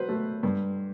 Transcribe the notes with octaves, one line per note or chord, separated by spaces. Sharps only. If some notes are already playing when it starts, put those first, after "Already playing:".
Already playing: F#3 B4 C5
A3
G2